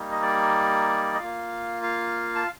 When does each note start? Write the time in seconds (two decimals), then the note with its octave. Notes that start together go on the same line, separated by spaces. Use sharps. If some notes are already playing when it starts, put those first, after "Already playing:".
Already playing: G3 A#3 D#4
0.11 D#5
0.22 D5
1.15 D#5
1.19 A#3 F4 F5
1.83 F5
2.35 A5